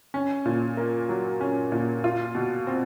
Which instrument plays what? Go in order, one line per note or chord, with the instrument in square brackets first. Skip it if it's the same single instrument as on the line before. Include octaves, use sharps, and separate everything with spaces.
[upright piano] C#4
A#2
A#3
F#3
C#4
A#2
F4
B2
C4